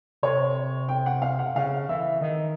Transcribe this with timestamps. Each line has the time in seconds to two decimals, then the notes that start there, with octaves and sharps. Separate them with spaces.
0.23 C3 C#5
0.89 G5
1.06 F#5
1.22 F5
1.39 F#5
1.55 C#3 F5
1.89 E3 E5
2.21 D#3 D#5